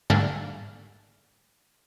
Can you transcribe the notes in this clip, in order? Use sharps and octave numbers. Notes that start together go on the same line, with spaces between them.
G#2 D3 G3 A3 A#3 D4